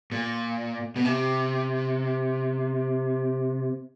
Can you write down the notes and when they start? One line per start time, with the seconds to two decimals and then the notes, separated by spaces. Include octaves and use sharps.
0.12 A#2
0.96 B2
1.05 C3